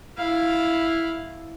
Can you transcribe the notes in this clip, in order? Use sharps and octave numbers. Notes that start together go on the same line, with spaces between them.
E4 F5